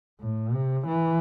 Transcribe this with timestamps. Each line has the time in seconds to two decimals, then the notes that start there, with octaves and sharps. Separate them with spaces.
0.20 A2
0.53 C3
0.87 E3